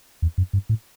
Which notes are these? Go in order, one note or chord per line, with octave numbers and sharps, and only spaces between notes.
E2
F#2
G2
A2